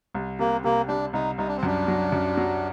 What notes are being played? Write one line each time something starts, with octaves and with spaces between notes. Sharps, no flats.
C2
C3 A#3
C3 A#3
G3 D4
C2 D#4
C2 D#4
D4
C4
F#2 D4
F#3
F#2
F#3